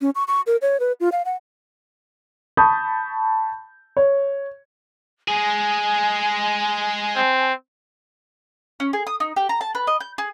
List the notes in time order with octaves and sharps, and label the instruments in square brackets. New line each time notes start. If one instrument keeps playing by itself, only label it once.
[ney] C#4
C#6
C#6
A#4
C#5
B4
F4
F5
F#5
[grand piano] A5 B5 C#6 D#6 G6
C#5
[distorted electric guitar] G#3 G#4 [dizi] G#5
[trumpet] C4
[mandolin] C#4
G#4
D#6
D#4
G4
A#5
A5
B4
D#5
G6
G#4